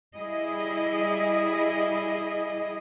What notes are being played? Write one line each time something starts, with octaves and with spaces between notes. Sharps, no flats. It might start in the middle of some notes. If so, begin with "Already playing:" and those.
G3 E4 G#4 D#5